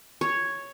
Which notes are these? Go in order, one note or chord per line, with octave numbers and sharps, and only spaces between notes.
C#5